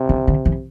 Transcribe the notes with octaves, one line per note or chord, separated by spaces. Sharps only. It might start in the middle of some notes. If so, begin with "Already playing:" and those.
Already playing: C3
D3
D3
E3